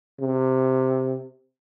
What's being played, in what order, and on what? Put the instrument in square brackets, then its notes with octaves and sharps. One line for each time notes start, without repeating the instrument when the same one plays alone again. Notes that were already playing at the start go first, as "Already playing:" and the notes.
[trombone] C3